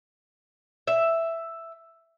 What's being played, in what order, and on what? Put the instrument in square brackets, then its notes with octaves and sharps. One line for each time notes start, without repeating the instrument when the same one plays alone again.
[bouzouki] E5